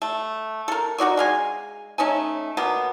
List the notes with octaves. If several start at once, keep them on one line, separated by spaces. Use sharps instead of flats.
A3
A4 A#4
D#4 F#4 D5 C#6
G#3 F5 G#5
A3 C#4 D#4 G#5
B2 A#3 B3